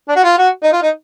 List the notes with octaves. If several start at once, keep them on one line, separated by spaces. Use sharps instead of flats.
D4
F#4
F4
F#4
D#4
F4
D#4